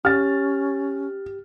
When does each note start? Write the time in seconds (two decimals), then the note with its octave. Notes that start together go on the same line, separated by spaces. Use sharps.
0.05 C#4 G4 F6 A6